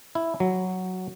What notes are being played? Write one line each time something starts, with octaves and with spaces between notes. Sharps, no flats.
E4
F#3